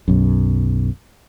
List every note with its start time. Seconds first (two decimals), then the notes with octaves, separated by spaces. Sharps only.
0.08 B1 F#2